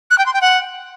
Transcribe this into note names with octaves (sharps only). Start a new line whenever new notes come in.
F#6
G5
C6
G5
F#5